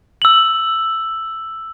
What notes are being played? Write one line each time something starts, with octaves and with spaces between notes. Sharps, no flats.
E6 F#7